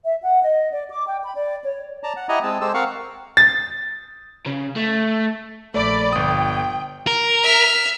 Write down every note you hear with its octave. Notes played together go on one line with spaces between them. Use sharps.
E5
F#5
D#5
D5
D6
G5
B5
D5
C#5
D5 A5 A#5
F#5
E4 G4 D#5 F#5 G#5 A#5
G#3 C4 A5
G#3 G4 A4 C5 E6
C4 A#4 F5 F#5 C#6
A6
C#3
A3
A#1 A3 D5 B5
G1 G5 D#6
A#4
E5 F6